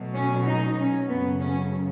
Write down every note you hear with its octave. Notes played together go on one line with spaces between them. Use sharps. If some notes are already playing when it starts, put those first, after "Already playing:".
Already playing: B2 F#3 A3
C#4
D#4
C#4
F#2 C#3 F#3 A3 B3
C#4